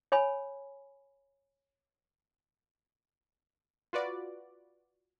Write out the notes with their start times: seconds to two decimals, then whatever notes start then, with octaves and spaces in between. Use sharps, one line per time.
0.12 C#5 G#5 B5
3.93 F4 F#4 B4 D5